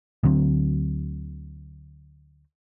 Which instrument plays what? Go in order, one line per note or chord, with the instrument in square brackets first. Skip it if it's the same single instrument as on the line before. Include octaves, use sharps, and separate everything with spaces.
[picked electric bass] D2 D3 F#3 C4